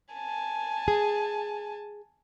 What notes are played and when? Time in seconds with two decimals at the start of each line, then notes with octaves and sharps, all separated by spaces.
0.14 G#5 A5
0.88 G#4